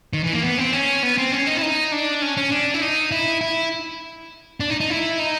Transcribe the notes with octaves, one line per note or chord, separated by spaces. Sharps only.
D#3
E3
A#3
B3
C4
C#4
B3
C4
C#4
D#4
E4
D#4
D4
C#4
C#4
D4
E4
D#4
E4
E4
D4
D#4
D#4
E4
D#4